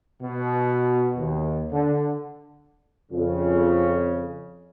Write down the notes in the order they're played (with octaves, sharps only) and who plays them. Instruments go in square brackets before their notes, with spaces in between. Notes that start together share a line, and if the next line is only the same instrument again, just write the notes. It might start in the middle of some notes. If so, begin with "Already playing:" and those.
[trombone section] B2
D#2
D3
[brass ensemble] F2 C#3